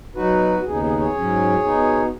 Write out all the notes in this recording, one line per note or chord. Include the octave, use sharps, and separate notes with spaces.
B2 F#3 D#4 F#4 B4
D#2 C#3 B3 D#4 G#4
G#4
G#4 C#5
G#2 F#3 C#4
B2 B3 D#4